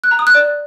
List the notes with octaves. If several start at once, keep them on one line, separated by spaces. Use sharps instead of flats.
F#6
A#5
D#6
F#6
D5